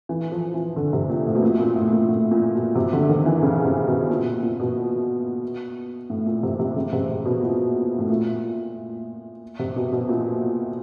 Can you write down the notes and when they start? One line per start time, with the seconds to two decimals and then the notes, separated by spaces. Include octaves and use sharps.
0.09 E3
0.32 F3
0.54 E3
0.76 D3
0.93 C3
1.09 A#2
1.26 A2
1.35 B2
1.43 A#2
1.59 A#2
1.76 A2
1.93 A#2
2.09 A2
2.31 A#2
2.54 B2
2.75 C3
2.93 D3
3.09 D#3
3.26 E3
3.42 C#3
3.65 C3
3.87 B2
4.10 A#2
4.43 A#2
4.60 B2
6.10 A2
6.26 A#2
6.43 C3
6.59 C3
6.76 C#3
6.93 C3
7.09 C3
7.25 B2
7.42 A#2
7.98 A2
8.09 A#2
9.59 C3
9.76 B2
9.92 B2
10.09 A#2